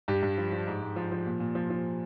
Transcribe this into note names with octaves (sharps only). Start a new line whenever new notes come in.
G2 G4
G2
F3
F3
G#2
G#2
F3
F3
A#2
A#2
F3
F3